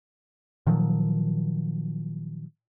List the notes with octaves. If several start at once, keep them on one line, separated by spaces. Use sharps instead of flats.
A#2 D#3 F3 F#3